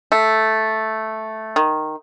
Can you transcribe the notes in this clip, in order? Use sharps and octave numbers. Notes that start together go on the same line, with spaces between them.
A3
D#3